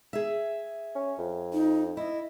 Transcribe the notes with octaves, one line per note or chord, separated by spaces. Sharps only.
G#4 E5
C#4
F2
D#4
E4 D#5